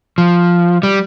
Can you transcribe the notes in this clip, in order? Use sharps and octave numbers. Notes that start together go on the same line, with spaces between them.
F3
G3